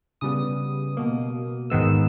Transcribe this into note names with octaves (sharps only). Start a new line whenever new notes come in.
C#3 G3 B3 D#6
B2 A#3
G#2 D#3 G#3 B3 E6